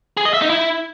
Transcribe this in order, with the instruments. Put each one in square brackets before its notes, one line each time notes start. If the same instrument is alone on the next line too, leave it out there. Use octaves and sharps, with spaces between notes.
[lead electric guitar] G#4
D#5
E5
D#4
E4